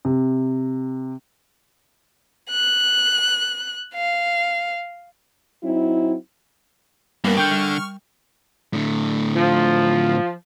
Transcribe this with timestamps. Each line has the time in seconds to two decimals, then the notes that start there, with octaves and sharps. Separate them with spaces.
0.05 C3
2.50 F#6
3.95 F5
5.63 F#3 C4 D#4 E4
7.24 G2 G3 A#3 B3 C#4 A#4
7.37 D3 G5 C#6 F6 G6
7.51 G3
8.73 A2 D3
9.34 F3